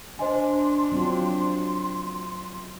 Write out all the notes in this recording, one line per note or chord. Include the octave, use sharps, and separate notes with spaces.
D4 C5 D#5 G#5 C6
F#3 C4 F4